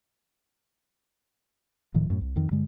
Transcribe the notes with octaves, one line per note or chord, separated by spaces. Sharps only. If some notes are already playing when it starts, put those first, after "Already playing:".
D1 A2 D#3 F3
F#2 A2
C2
F2 D#3
G2 D3 G#3